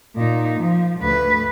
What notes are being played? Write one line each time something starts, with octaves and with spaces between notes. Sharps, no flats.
A#2 D#4
F3
D2 B4